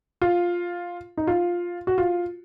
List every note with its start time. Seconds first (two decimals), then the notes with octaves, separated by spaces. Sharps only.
0.22 F4
1.17 D#4
1.27 F4
1.87 F#4
1.98 F4